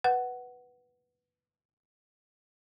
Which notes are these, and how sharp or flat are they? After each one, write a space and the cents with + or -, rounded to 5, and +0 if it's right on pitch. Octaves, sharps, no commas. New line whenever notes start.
B4 +0 F#5 +10